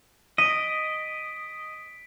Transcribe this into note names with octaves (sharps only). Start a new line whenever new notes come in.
D#5 B6 D7 D#7